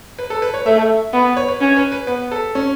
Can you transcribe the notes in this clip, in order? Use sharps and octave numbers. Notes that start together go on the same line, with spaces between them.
B4
A4
B4
C#5
A3 E5
B3 F#5
C#5
B4
C#4
B4
B4
B3 B4
A4
C#4